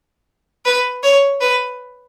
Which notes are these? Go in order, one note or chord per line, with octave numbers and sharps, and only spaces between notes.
B4
C#5
B4